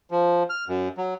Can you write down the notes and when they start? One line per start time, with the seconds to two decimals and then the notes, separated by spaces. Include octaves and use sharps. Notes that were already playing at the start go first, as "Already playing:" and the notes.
0.11 F3
0.50 F6
0.68 F#2
0.98 F#3